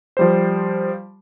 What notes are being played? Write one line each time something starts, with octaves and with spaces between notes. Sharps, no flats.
F3 G3 C5